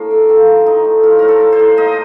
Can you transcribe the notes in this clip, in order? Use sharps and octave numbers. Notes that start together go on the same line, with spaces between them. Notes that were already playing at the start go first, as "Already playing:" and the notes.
Already playing: A2 A#3 D4
A3
F3 C4
A2
A3 D#4
A2
A2 F4
A2 A#4
A4
A2
C5
A2
A#3 D#5